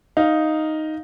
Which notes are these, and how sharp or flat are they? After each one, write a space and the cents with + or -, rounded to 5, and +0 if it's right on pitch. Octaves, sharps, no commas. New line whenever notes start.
D#4 +0 F5 +0